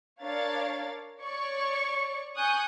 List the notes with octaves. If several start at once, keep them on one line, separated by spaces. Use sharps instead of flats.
D4 A#4 C#5 D5 F5 A6
C#5 D5 C#6
G#5 C#6 D#6 F#6 G6